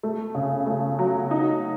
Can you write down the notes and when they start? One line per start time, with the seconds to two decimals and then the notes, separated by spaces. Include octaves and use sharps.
0.03 A3
0.35 C#3
0.66 A3
0.99 F#3
1.31 D#4